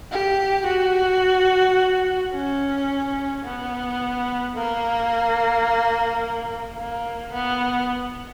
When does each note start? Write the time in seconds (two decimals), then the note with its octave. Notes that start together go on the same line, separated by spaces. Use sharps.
0.12 G4
0.67 F#4
2.34 C#4
3.45 B3
4.56 A#3
6.78 A#3
7.33 B3